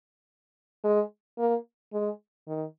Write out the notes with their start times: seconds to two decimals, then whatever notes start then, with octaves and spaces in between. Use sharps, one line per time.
0.84 G#3
1.39 A#3
1.93 G#3
2.47 D#3